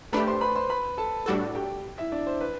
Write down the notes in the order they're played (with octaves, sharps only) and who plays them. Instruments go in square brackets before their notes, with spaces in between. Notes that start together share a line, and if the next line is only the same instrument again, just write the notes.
[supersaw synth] A3 D4 G4 [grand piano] B4 B5
[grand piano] C5 C6
B4 B5
C5 C6
B4 B5
A4 A5
[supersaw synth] A2 G3 D4 F#4 A4
[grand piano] G4 G5
E4 E5
D4 D5
C5
B4